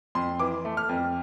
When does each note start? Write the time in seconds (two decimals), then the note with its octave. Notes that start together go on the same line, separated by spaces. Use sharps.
0.15 F2 C6
0.39 E3 D6
0.65 A3
0.77 F6
0.89 F2